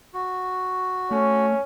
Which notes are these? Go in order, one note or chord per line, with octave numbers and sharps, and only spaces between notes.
F#4
A3 C#4